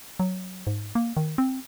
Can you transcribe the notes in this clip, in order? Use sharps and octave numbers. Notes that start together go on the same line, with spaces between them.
F#3
G#2
A#3
D#3
C4